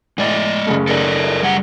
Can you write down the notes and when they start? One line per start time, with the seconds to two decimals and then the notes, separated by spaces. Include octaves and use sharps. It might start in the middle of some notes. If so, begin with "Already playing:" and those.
0.18 A2 G#3 D5 D#5
0.66 F#1 C#3 A3
0.87 A4 A#4 D5
1.43 G3 F#5